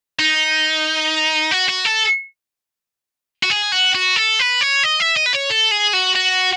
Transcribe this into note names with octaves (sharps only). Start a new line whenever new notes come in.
D#4
F#4
F#4
A4
F#4
G#4
F#4
F#4
A4
B4
C#5
D#5
E5
D#5
B4
C#5
A4
G#4
F#4
F#4